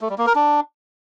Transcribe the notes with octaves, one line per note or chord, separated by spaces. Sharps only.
A3
G3
A#3
A#4
D4